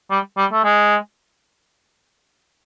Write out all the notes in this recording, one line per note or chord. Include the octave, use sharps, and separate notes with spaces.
G3
G3
A3
G#3